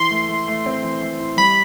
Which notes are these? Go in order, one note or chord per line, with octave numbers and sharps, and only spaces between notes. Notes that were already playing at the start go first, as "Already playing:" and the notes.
Already playing: E3 C6
A3
A3
A3
C4
E3
A3
A2
G3 B5